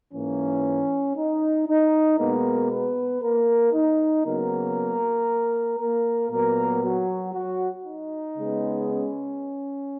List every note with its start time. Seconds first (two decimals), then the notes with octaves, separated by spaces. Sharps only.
0.13 G#2 E3 A#3 C#4
1.17 D#4
1.67 D#4
2.18 B2 G#3 A#3 B3 A#4
2.71 B3 B4
3.22 A#3 A#4
3.73 D#4
4.24 C#3 F#3 A#3 B3 A#4
5.79 A#3 A#4
6.30 A#2 F#3 A#3 B3 A#4
6.81 F#3 F#4
7.33 F#3 F#4
7.85 D#4
8.36 C#3 G#3 B3
8.88 C#4